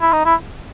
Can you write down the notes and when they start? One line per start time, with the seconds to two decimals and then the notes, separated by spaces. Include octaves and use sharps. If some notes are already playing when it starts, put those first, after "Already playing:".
0.02 E4
0.13 D#4
0.25 E4